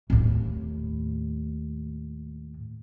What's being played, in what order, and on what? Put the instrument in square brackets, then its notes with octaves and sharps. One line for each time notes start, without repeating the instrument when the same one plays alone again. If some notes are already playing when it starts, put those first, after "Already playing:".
[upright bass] D#2 A2